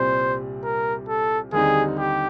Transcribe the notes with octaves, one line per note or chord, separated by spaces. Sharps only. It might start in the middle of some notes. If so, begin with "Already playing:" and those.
Already playing: C2 A#2 G3 C4 C5
A#4
A4
D#2 D3 G3 C4 D#4 G#4
G4